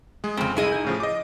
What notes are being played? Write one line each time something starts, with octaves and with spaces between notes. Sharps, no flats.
G#3 G#4
F2 C#3 C4
C2 E4 G#4 D#5
D#4 G6
A2 C#3 F3
D#5 D6